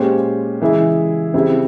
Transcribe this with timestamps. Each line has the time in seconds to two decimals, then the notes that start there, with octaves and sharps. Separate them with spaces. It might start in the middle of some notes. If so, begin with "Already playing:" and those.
Already playing: A#2 G#3 C#4 G4 C5
0.61 C#3 E3 G#3 E4 G#4
1.34 F2 C#3 G3 C4 E4